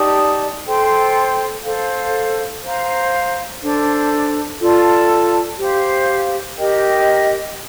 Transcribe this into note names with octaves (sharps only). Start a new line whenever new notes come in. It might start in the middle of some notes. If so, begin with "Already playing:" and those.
Already playing: D#4 G4 D5 A5
A4 C5 G5 C6
A4 C5 F5
C5 F5 A#5
D4 A4 C5
F4 A4 D5 A5
G4 C5 F5
G4 A#4 D#5 G5